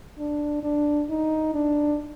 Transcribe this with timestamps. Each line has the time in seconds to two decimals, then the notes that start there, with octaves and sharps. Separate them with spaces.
0.19 D4
0.63 D4
1.10 D#4
1.55 D4